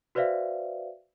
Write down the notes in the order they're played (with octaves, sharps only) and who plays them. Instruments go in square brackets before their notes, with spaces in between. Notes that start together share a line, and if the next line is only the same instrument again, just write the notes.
[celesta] F#4 B4 C5 D5 E5 F5